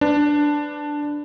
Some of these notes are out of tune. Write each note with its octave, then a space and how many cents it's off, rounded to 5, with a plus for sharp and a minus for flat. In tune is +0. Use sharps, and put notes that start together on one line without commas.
D4 +0 B4 +20